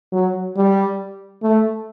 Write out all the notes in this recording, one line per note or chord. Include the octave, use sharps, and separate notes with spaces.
F#3
G3
A3